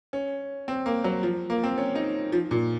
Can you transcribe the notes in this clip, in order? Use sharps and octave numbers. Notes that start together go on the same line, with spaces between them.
C#4
C4
A#3
F#3
F3
A#3
C4
C#4
D#4
F3
A#2